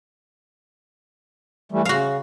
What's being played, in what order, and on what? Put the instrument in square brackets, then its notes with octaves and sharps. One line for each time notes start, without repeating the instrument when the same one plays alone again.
[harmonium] E3 G3 A3
[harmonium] C#3 [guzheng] F#4 F5